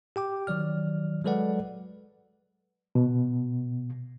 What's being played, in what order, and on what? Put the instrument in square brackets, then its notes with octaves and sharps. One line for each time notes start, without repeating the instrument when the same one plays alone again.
[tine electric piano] G4 G5 D6
D#3 F#3 D5 F6
F#3 G#3 A4 B4 D5 F#5
[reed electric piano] B2